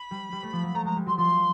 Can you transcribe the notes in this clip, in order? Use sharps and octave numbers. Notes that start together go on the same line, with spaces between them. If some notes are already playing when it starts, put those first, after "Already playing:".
Already playing: B5
G3
G3
A3
F3
F#3
A3 A#5
G#3 A#5
G3
F#3 C6
F3 C6